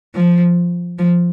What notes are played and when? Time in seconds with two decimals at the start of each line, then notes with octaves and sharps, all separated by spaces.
0.15 F3
0.99 F3